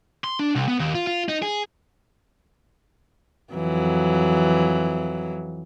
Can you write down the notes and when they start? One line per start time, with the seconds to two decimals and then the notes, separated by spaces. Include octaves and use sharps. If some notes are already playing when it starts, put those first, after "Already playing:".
0.24 C6
0.39 D4
0.55 C2
0.68 B3
0.80 D#2
0.95 F4
1.07 F4
1.29 D#4
1.42 G#4
3.53 F2 E3 F#3